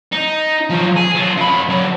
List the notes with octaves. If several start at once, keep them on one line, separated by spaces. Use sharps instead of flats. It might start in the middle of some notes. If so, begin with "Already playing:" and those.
D#4
F3 F#3
G#4
F#3 F4
F#2 B5
D3 F#3